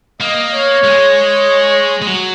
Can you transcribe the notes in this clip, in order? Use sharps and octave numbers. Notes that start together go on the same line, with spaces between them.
A#3 D#5
C#5
G#3
G#3
F#3